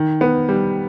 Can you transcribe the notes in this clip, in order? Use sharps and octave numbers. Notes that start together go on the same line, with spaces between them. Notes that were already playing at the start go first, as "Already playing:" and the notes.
Already playing: D#3
B3
G3